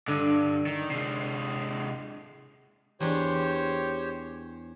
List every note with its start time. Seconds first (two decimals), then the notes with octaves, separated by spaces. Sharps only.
0.08 G2 D3
0.67 D#3
0.90 C3 G#3
3.01 E2 D4 G4 C5 C#5 C6